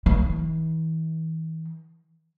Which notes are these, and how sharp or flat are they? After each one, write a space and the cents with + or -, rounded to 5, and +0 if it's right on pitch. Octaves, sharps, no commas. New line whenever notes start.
E3 -40